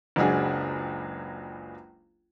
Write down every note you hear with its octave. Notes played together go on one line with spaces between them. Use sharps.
F#1 C#2 F#3 D4 G#4